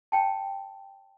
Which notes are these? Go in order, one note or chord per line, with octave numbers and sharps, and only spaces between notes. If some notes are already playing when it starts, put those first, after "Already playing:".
C#5 G5 A5